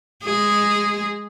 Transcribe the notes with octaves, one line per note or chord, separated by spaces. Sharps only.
G#3 G#4